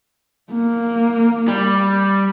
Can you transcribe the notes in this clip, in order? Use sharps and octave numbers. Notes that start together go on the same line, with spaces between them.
A#3
G3